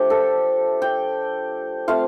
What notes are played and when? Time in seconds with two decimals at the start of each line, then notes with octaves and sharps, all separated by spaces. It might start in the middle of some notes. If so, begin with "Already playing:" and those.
Already playing: F3 A3 D4 G4
0.10 A4
0.82 G5
1.88 A3 C4 F4 F5